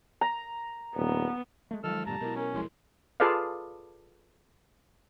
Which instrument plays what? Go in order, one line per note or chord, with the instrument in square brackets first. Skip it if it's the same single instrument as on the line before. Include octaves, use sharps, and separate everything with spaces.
[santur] A#5
[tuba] D#1 [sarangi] B3
[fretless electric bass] G#3 A3
[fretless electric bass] D#3 F3 [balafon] F#3 G#3 [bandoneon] A4 E6 F6
[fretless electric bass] G2 A#2 D3 [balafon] G4 [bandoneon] A5 A#5
[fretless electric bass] B2 [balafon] E4 A#4
[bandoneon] C#4 [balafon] A#4 A#5
[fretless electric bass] D#1 B1 G#3 [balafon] F3 E4 C6
[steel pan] F4 G#4 A4 B4 D5 F5